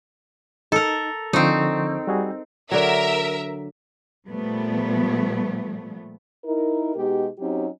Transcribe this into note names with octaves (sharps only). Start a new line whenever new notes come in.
D#4 A4 A#4
D3 F3 C4 D#4 C#6
G3 F#4 G#4
D3 F#3 A#4 E5
A#2 F3 G3 A3 B3
D#4 E4 A#4
B2 G#3 D#4 G4
F#3 C4 C#4 D#4 G4